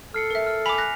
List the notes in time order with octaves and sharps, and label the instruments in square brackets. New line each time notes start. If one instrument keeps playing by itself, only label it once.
[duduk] A4 [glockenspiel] F6 C7 C#7
[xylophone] A#4 E5
[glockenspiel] F6
[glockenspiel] G#5 B6 F7 [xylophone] B5 D6
[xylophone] F#6 [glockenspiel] A#6